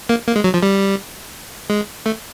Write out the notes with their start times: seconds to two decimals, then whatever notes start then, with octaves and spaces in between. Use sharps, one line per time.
0.09 A#3
0.28 A#3
0.36 G#3
0.44 F#3
0.54 F3
0.63 G3
1.70 G#3
2.06 A3